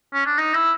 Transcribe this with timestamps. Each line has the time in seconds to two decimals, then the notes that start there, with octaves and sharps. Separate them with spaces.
0.13 C#4
0.26 D4
0.38 D#4
0.54 E4